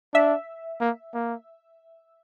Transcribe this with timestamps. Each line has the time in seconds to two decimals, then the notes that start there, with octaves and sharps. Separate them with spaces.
0.14 D4 E5
0.81 A#3
1.14 A#3